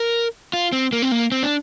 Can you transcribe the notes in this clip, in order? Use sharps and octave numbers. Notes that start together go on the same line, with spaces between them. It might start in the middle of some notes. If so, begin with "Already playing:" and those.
Already playing: A#4
F4
C4
A#3
C4
A#3
C4
D4